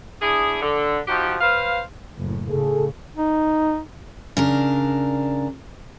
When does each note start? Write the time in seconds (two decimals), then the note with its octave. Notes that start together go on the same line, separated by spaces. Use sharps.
0.22 D4 E4 G#4
0.62 D3
1.07 F3 D#4 F#4 G4
1.41 B4 C5 F5
2.17 F#1 A2
2.50 A2 C#3 G#4 A4
3.17 D#4
4.37 C#3 D4 A#4